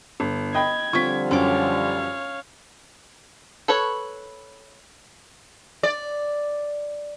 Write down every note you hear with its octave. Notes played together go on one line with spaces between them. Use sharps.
G1
D#5 G5 B5 G#6
D3 F3 G3 C4 F4 C#6 B6
F#2 C#4 C#5 F5 D6
A4 B4 C#5
D5